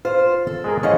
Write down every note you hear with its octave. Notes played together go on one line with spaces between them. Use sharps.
F4 C5 F5
A4
G#3 G#4 A#4
F3 C#4 E4 D#5 F5 F#5